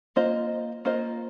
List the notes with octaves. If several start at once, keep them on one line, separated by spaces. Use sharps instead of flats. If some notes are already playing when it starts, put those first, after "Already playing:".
A#3 F4 C5 D#5
A#3 F4 C5 D#5